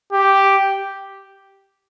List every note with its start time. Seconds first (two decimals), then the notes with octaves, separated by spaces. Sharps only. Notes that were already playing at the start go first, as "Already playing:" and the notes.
0.12 G4